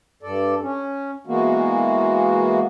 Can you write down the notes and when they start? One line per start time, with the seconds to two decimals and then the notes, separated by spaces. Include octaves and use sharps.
0.23 G2 A4 D5
0.62 C#4
1.27 E3 G#3 A#3 B3 F#4